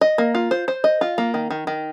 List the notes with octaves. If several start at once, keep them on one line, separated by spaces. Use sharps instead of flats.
D#5
A#3
F4
C5
C5
D#5
F4
A#3
D#3
D#3
D#3